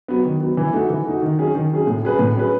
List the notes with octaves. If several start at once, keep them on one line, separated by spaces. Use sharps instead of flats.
F#3 B3
D#3
F#3 B3
E3
A3 D#4 F#4
E3
A3 D#4 F#4
D#3
F#3 C#4 G#4
D#3
F#3 C#4 G#4
A2
F#3 C#4 G#4 B4
A2
F#3 C#4 G#4 B4